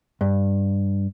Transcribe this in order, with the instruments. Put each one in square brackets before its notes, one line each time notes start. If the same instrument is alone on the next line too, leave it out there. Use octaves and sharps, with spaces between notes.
[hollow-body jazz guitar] G2